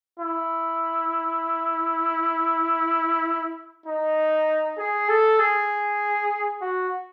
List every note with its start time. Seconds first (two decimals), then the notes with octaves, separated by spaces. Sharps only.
0.20 E4
3.86 D#4
4.78 G#4
5.09 A4
5.39 G#4
6.61 F#4